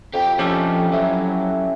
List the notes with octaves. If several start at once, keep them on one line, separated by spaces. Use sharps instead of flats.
F2 G4 G5
F3 C#4 D4 G4 A4
F#3 E4